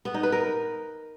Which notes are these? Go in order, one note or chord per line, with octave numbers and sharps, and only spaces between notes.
B3
D#4
B4
A#4